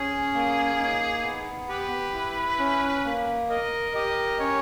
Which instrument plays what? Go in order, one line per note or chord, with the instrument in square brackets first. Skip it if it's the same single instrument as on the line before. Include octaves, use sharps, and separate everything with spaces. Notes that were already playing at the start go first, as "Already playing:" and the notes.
Already playing: [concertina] C#4 [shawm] G#4
[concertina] A#3
D#4
B3
[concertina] G4 [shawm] B4
[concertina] E4
C#4
A#3
[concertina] A#4 [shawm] D#5
[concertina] G4 [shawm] D#5
[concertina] C#4 [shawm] C#5